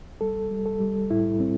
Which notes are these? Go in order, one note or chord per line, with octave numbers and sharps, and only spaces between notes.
G3 A4
G3
A4
G3
A2 E4
G3 C4